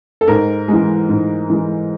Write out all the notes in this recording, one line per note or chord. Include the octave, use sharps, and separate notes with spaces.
A4
G#2 A#4
E3 G#3
G#2
E3 G#3